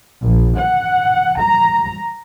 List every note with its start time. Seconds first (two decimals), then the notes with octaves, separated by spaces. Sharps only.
0.22 A#1
0.58 F#5
1.39 A#5